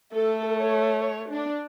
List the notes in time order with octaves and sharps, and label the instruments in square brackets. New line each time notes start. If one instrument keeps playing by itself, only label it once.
[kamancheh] A3 [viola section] A4
[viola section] C#5
C#5
D4